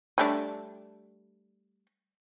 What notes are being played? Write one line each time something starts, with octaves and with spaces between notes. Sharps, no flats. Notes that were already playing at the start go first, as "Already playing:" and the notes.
G3 A3 D4